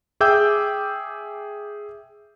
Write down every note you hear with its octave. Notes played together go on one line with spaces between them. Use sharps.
G#4 E5 G5 D6 E6 G6